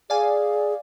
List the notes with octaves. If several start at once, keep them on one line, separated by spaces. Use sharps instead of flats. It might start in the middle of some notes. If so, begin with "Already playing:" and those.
G#4 D5 F5 G#5